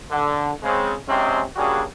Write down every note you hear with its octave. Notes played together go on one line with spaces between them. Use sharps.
D3
C#3 G#3 C4
G#2 C3 G#3 C4 C#4
C#3 G3 A#3 D4 F#4 G#4